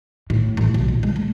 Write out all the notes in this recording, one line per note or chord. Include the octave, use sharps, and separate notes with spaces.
A2
A1
B1
A#2
G#3
A3